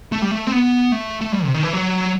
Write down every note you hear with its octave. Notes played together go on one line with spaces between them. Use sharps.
A3
G3
A3
C4
B3
A3
A3
G3
C3
D#3
E3
F#3